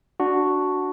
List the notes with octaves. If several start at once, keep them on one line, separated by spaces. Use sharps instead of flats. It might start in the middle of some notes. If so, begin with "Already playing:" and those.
D4 F#4